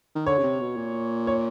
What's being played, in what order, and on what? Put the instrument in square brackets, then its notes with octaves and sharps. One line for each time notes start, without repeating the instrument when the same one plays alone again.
[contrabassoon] D#3
[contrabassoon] D3 [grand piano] C#5
[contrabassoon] C#3
C3
B2
A#2
[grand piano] C#5